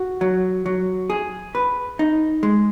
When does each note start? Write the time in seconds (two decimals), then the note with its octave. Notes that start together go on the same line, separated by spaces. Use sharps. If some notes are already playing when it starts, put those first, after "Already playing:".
Already playing: F#4
0.21 F#3
0.66 F#3
1.10 G#4
1.55 B4
1.99 D#4
2.43 G#3